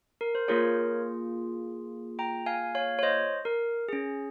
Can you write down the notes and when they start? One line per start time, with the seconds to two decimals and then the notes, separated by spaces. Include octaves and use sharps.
0.21 A#4
0.35 C5
0.48 A#3 F4 G#4 A#4 C#5
2.19 G5 A#5
2.46 F5 G#5
2.75 C#5 F5
2.99 C#5
3.03 C5 D#5
3.45 A#4
3.89 C#4 G#4